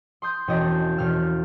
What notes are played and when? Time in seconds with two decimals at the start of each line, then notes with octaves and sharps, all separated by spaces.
0.22 C6 D#6 G6
0.48 E1 C#4 D4 D#5 G5
0.97 E1 F6 E7